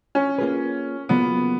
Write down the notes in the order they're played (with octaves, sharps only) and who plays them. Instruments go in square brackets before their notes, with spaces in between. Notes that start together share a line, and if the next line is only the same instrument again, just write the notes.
[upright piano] C#4
[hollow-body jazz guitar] A#3 F4 G#4 B4
[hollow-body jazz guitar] C#3 F#3 A#3 F4 [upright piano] B3